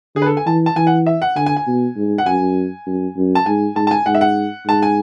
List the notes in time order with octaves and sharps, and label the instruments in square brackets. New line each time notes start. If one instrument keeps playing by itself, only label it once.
[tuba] D3 [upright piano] G#4
[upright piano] B4
A4
G#5
[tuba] E3 [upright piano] A5
[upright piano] A5
[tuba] E3 [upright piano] G#5
[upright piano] F#5
E5
F#5
[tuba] D3 [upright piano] G#5
[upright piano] G#5
G#5
[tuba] B2
G#2
[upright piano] F#5
[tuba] F#2 [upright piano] G#5
[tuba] F#2
F#2
[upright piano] A5
[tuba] G#2 [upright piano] G#5
[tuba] G#2 [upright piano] A5
[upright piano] A5
G#5
[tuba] G#2 [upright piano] F#5
[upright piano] E5
F#5
[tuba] G#2 [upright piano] A5
[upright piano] G#5